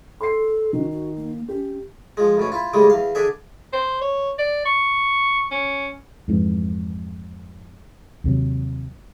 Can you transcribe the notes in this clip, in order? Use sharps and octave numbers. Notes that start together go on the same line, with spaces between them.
A4 C6 C7
D#3 F#4
F#4
A#3
C#4 G4
F3 G#3
D2 B2 C#4
E4 F4
A2 C#3 G3 G#3
E2 F5
D3 D4 G#4 E5
C5
C#5
D5
C#6
C#4
F2 G#2 E3
D#2 C3 F#3